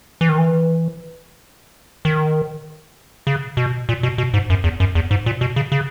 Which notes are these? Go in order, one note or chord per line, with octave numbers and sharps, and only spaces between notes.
E3
D#3
E3
D#3
C#3
B2
A#2
B2
B2
G#2
F#2
E2
F#2
E2
G#2
A#2
B2
C#3
C#3